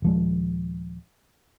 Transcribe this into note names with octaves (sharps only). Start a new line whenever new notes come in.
D#1 F3 G#3